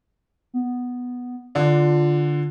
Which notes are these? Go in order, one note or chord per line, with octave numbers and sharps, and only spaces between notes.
B3
D3 D4 F4